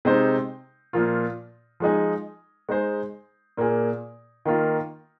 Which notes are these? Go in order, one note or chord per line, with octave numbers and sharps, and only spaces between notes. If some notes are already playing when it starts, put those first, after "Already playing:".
C3 G#3 D#4 C5
A#2 F3 A#3 F4
F3 G#3 D#4 G#4
G#3 D#4 G#4 C5
A#2 A#3 G#4
D#3 A#3 F4